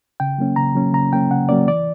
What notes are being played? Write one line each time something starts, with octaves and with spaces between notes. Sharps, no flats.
C#3 G5
F#3 A#3 C#4
C#3 A#5
F#3 A#3 C#4
C#3 A#5
F#3 A#3 C#4 G5
C#3 F#5
F#3 A#3 C#4 D5
E3 D5